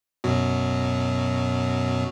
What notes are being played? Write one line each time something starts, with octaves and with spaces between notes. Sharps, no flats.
F#2 B2 F#3